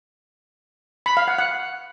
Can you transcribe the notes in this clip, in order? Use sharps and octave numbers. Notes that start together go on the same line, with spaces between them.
B5
F5
F#5
F#5